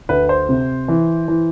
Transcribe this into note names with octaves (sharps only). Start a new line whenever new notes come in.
D2 B4
C5
C3
E3
E3